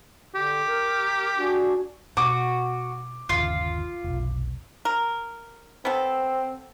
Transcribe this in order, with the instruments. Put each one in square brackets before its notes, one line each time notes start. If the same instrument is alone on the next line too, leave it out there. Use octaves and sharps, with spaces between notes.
[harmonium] D3 [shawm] G4
[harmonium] A#4
D4 F#4 G#4
[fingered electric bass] B2 [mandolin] F#4 [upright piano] D6
[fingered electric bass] G1 D#2 C#3 [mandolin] F4
[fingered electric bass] F1 B1
[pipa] A#4
[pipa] B3 A4 [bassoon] C4